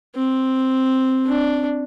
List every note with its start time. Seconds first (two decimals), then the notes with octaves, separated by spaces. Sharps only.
0.16 C4
1.26 D4